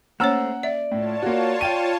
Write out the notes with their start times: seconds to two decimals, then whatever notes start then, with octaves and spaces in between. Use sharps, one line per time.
0.20 A3 A#3 C#4 C5 C#5 F#5 A#5 E6
0.63 D5 E5
0.91 A2 F4 C#5 A5
1.22 A#3 F#4
1.61 F5 G5 D#7